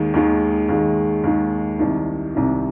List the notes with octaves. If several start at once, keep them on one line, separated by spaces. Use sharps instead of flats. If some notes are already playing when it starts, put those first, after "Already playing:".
Already playing: D#2 D#3 G#3
D#2 D#3 G#3
D#2 D#3 G#3
D#2 D#3 G#3
C2 C3 D#3
C2 C3 D#3